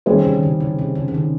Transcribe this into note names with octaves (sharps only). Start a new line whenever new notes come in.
D#3 G3 C#4 G#4 C5
C3
D#3
C#3
C#3
C3
C#3
D#3
C#3